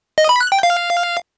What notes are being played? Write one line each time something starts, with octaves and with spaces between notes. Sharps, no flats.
D#5
B5
F#6
G5
F5